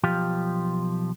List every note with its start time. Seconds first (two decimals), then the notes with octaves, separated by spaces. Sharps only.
0.03 B1 F3 G4 F5